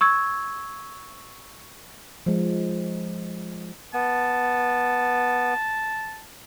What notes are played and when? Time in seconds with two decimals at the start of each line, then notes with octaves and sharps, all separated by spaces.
0.01 C#6 E6 G#6
2.26 F3 G#3
3.94 B3 A5